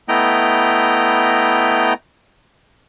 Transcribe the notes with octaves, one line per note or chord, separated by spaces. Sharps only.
A3 B3 E4 D#5 G5 A#5